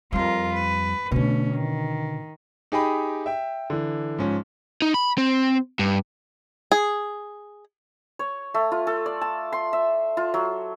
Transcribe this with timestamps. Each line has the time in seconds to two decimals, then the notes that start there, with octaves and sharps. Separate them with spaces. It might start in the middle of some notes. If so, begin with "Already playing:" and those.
0.13 F2 G3 F4 A#4
0.53 B4
1.11 B2 D3 A3 C#4
1.54 D#3
2.72 D#4 G4 G#4 D#5 G5 B5
3.26 E5 G5
3.70 D3 E3
4.19 G#2 F3 C#4
4.82 D#4
4.94 B5
5.18 C4
5.79 G2
6.72 G#4
8.19 C#5
8.54 A3
8.71 F4
8.87 A4
9.06 D5
9.21 A5
9.53 C6
9.73 E5
10.17 F4
10.34 F#3